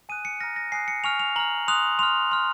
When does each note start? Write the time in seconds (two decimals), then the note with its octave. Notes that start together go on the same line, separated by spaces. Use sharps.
0.09 G#5 D#6 F#6 D#7
0.25 C#7
0.40 A#5 F6 A#6
0.56 A#6
0.72 G#5 D#6 F#6 C7
0.88 C#7
1.04 G#5 C#6 F6 F7
1.20 F7
1.36 A#5 F6 F#7
1.68 C6 D#6 F#6 F7
1.99 C6 F6 F7
2.32 C6 F6